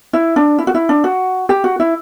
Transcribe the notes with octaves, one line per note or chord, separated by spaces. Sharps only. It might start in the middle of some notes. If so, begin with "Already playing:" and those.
E4
D4
E4
F#4
E4
D4
F#4
G4
F#4
E4